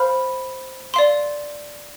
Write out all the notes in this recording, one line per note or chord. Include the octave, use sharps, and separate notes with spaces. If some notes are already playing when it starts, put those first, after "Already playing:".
Already playing: C5 F5 B5 F6
D5 F5 C6